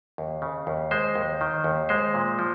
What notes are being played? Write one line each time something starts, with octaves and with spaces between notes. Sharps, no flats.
D#2
C#3
D#2
G#3 C5
D#2
D#3
D#2
G#3 C5
A#2
F3